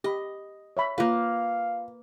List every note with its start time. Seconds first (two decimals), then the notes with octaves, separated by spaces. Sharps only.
0.04 G4 D#5 B5
0.77 C#5 E5 B5
0.98 A#3 F4 B4 F5